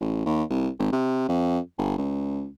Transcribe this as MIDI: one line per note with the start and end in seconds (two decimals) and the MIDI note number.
0.01 0.25 33
0.26 0.43 39
0.50 0.68 36
0.79 0.92 32
0.93 1.28 48
1.29 1.59 41
1.78 1.96 31
1.98 2.48 37